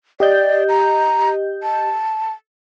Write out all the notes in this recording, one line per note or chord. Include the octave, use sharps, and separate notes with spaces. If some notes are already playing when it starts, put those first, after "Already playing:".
G4 D5 D#5 G6
A#5
A5